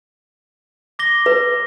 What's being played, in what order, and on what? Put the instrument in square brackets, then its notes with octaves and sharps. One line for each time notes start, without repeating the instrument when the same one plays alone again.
[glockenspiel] D6 A#6 G7
[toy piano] B4